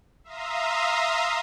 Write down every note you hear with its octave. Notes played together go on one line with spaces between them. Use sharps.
E5 F5 A#5 C6 D#6